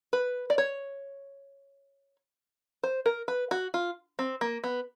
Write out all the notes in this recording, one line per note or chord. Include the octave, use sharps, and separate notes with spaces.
B4
D5
C#5
C5
A#4
B4
F#4
F4
C4
A#3
B3